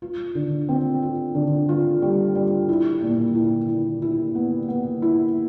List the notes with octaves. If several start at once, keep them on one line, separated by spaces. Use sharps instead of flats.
F4
D3
C4
F4
D3
F4
G3
G3
E4
A#2
E4
E4
E4
B3
B3
E4